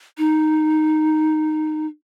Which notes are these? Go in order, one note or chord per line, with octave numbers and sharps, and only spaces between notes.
D#4